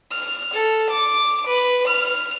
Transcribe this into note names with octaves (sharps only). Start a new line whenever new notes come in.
F6
A4
D6
B4
F6